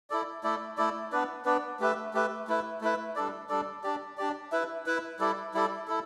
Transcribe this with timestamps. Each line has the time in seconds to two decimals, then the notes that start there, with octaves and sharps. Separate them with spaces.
0.10 E4 A4 D5
0.43 A3 E4 A4 D5
0.77 A3 E4 A4 D5
1.12 B3 D4 B4 D5
1.45 B3 D4 B4 D5
1.80 A3 G4 B4 E5
2.14 A3 G4 B4 E5
2.48 A3 E4 B4 E5
2.81 A3 E4 B4 E5
3.16 G3 D4 A4 D5
3.49 G3 D4 A4 D5
3.83 D4 G4 D5
4.17 D4 G4 D5
4.52 E4 B4 E5
4.86 E4 B4 E5
5.20 G3 E4 A4 D5
5.54 G3 E4 A4 D5
5.88 E4 A4